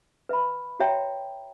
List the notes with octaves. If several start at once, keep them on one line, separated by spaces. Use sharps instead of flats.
B4 E5 B5
F#4 C#5 E5 G5 A#5